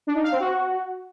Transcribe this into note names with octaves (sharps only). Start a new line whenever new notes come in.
D4
D#4
F5
C4
F#4